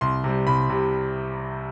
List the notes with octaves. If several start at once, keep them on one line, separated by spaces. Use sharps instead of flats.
C2 C6
C3 G3
C2 B5
C3 G3